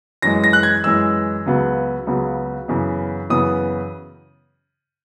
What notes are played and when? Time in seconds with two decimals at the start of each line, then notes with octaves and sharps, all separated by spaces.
0.22 F#2 E3 G#3 A#6
0.44 A#6
0.53 F#6
0.63 G#6
0.84 F#2 E3 G#3 E6
1.46 C#2 C#3 F#3 B3
2.07 C#2 C#3 F#3 B3
2.68 F#2 C#3 E3 B3
3.29 F#2 C#3 E3 B3 D#6